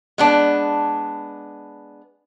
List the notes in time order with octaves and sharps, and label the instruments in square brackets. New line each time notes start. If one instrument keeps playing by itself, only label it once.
[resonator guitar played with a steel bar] G#3 B3 D4